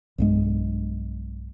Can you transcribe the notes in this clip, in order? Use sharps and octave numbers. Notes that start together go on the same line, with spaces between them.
B1 G2 G#3